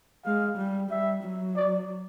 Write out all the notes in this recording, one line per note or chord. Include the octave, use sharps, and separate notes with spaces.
G#3 F5
G3
G3 E5
F#3
D5